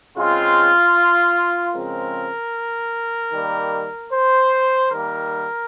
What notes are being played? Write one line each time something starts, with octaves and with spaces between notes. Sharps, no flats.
C#3 G#3 C4 F4
C#3 F3 G#3 C4 A#4
D#3 G3 A#3
C5
D#3 G3 A#3 A#4